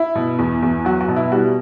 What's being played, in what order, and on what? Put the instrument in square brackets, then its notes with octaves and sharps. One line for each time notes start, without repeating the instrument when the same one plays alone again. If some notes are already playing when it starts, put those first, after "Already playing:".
Already playing: [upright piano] E4
B2
E2
E2
F#3 F#4
F#4
B2
E4
G3 F#4